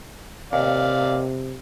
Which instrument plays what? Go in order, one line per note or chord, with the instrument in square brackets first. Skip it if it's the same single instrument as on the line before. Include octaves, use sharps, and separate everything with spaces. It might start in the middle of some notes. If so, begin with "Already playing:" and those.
[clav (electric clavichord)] D#2 [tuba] C3 [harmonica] D5 F5